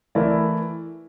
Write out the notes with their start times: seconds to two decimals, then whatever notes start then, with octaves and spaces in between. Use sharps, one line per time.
0.15 E3 A3 E4 A#4 D5